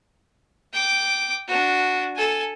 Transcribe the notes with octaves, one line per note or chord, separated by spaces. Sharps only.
G5 D6
D4 F#4
A4 G#5